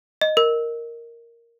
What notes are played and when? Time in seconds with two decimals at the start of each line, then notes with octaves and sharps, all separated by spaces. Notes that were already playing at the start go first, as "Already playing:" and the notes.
0.21 D#5
0.37 A#4